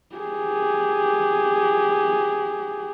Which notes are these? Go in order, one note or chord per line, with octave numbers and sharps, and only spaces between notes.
G4 G#4